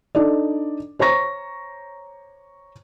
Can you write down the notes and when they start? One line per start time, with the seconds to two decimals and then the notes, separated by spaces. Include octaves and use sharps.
0.15 D4 D#4 A4 D5
0.99 C5 C#5 A#5 C#6 A#6